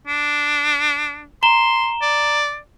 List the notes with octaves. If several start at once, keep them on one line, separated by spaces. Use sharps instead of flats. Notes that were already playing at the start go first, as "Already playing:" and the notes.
D4
A#5 C6 E7 G7
D5